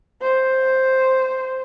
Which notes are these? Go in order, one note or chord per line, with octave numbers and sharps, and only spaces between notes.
C5